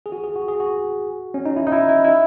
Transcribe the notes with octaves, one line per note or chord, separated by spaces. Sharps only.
G#4
F#4
G#4
F#4
G#4
F#4
C#4
D#4
E4
D#4
E4
E4
E4